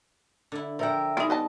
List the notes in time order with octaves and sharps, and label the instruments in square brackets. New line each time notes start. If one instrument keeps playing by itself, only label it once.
[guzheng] D3 E4
[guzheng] F3 F#5 [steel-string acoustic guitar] A#4 E5 G5
[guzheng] G3 G#3 [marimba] B3 D#4 [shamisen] E4
[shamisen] B4 D#5 A5